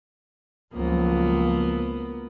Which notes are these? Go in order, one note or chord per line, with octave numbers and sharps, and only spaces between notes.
C#2 F3 F#3 A#3 B3